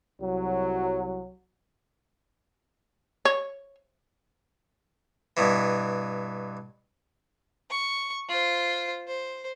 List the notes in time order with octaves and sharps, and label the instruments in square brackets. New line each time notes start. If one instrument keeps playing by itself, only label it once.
[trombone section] C2 F#3
[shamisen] C#5
[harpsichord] G2 B2 E3
[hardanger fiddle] C#6
F4 C5
C5